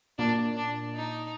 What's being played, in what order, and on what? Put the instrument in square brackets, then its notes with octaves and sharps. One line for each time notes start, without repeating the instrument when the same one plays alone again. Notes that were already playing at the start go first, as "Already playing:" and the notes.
[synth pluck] A#2 A#3 [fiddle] D4
[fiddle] D4
D#4